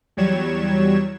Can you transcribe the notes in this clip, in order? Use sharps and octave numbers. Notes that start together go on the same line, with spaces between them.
E2 F#3 G3 C#5 G#6 E7